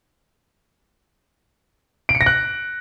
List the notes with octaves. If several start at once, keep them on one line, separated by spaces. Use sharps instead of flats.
D7
C#7
A#6
F#6